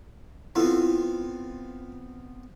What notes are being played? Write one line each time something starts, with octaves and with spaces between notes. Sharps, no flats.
B3 C4 E4 F4 A4